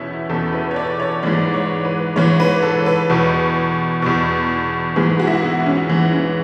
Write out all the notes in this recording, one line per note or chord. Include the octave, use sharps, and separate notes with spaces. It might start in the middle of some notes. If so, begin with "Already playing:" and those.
Already playing: E2 B2 B3 C#4 E4
E2 B2 A4
B4
C#5
D5
C#5
G#2 E3 D5
C#5
B4
G#2 E3 C#5
B4
A4
B4
E2 B2
E2 B2
G#2 E3 G#4
F#4
E4
F#4
B3
C#4
G#2 E3
C#4